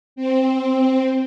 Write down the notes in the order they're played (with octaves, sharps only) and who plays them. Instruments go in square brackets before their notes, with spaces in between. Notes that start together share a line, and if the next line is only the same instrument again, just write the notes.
[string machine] C4